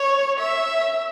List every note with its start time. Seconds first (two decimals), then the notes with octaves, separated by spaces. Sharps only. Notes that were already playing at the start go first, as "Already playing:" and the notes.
Already playing: C#5
0.39 E5